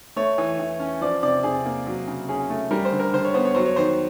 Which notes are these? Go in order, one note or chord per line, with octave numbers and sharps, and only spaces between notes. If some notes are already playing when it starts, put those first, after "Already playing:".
A3 C#5
E3
E3
C#4
F3 D5
C3 D5
C3 G#4
A#3
F#3
C#3
C#4 G#4
A3
G3 A#4
C5
D3
A#4
D3 C5
C#5
B3 C5
C#5
F#3 C5
C#5
D#3 C5